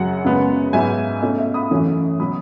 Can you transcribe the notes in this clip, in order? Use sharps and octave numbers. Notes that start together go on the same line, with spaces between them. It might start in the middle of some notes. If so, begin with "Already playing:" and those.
Already playing: F#2 C#3 F#3 C#4 F#5
F#2 C#3 G#3 B3
G#2 F#3 B3 E5 G#5
B2 A3 C#4 D#5
E5
B5 D#6
F#2 E3 A3 C#4
B2 F#3 B5 D#6